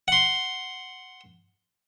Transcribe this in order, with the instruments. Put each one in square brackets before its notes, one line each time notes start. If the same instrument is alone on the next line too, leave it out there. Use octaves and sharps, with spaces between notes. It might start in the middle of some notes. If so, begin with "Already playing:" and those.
[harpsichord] F#5 C6